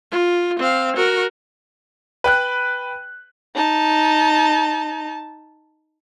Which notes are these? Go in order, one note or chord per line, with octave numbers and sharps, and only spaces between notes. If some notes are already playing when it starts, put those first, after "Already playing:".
F4
C4 F5
F#4 A#4
B4 G5 F#6
D#4 A5